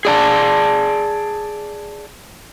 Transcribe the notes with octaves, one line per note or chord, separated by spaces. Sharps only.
G#4 D5 A5